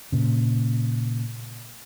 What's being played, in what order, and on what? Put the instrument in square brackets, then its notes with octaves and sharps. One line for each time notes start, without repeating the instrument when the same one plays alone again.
[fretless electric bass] A#2 C#3